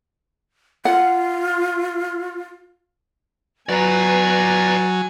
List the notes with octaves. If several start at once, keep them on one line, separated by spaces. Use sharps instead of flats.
F4 F#5
F#3 B4 D5 G#5 A#5